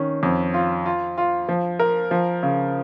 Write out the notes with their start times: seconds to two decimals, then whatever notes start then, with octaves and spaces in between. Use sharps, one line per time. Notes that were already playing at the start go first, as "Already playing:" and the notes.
Already playing: D#3 C#4
0.23 F2
0.54 F4
0.86 F4
1.18 F4
1.49 F3
1.79 A#4
2.11 F3
2.43 C#3